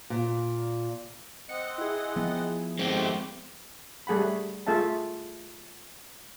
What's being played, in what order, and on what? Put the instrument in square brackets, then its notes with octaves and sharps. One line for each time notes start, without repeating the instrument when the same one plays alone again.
[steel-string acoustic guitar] A#2
[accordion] C4 D#5 F#5 [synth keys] C#7
[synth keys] E4 G#4
[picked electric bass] F3 B3
[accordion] A2 G4 [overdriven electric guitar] G#3 C4
[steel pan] G3 A3 G#4 F#5 B5
A3 F4 G#4 E5 F5 A5